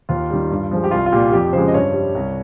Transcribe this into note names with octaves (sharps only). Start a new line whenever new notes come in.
D#2 F4
D#3 G3
G2
F3 G#3
G4
C2 F4
F4
A#2 G3 G4
F2 G4
C#3 F3 G#3 C5
D#5
G2 C#5
G3
C2